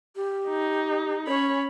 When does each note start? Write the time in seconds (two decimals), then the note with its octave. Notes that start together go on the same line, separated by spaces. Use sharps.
0.16 G4
0.48 D#4
1.27 C#4 C#5 B5